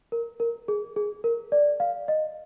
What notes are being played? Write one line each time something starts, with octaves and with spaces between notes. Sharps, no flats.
A#4
A#4
G#4
G#4
A#4
D5
F5
D#5